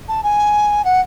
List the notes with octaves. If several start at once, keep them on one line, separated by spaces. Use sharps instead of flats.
A5
G#5
F#5